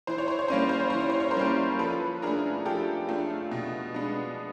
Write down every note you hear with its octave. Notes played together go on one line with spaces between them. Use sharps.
E3 C5
C#5
C5
C#5
G3 A#3 C#4 C5
C#5
C5
C#5
E3 C5
C#5
C5
C#5
A#4 C5
G3 A#3 C#4
F3 A4 B4
A3 D4 G#4 A#4
F3 G4 A4
A3 D4 F4
B2
G#3 B3 D4